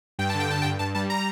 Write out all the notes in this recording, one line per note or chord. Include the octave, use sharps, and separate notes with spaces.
G2 G5
D3 A5
G5
G2 A5
G5
G2
G2 A5
G3 A5
A#5